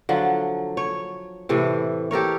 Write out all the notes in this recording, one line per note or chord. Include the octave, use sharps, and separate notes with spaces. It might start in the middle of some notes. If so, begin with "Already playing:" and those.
D3 F3 F#3
C#5
A2 C3 E3 A4
G4 A4 A#4 C#5